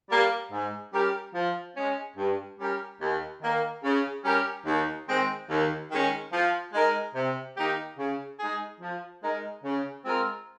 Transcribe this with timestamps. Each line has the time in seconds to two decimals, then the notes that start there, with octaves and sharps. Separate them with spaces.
0.09 G3 A#3
0.51 G#2
0.92 G3 C#4 G4 A#4
1.33 F3
1.76 G#3 C#4
2.16 G2
2.59 G3 C#4 G4 A#4
3.00 D#2
3.41 D#3 A#3
3.83 C#3
4.24 G3 C#4 G4 A#4
4.65 D#2
5.07 D#3 G#3 C4
5.49 D#2
5.90 D#3 G#3 C#4
6.32 F3
6.73 G#3 D#4 A#4
7.15 C3
7.56 D#3 A#3 D#4 G4
7.97 C#3
8.39 G#3 D#4 G#4
8.80 F3
9.22 G#3 D#4 A#4
9.64 C#3
10.05 G#3 C4 F4 A#4